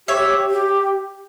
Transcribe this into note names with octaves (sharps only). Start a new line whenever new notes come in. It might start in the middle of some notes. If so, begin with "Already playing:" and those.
G4 C#5 E5
G4